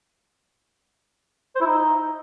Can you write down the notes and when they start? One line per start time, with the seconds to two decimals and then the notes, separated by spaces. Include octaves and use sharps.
1.55 C5
1.61 E4
1.66 D#4